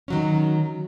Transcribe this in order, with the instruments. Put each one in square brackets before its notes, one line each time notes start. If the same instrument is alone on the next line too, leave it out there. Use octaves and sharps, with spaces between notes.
[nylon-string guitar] D#3 F#3 C#4